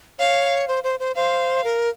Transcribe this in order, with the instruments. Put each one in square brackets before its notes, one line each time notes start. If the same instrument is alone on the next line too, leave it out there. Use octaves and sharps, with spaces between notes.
[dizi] C#5 [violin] F5
[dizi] C5
C5
C5
[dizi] C5 [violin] F5
[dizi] A#4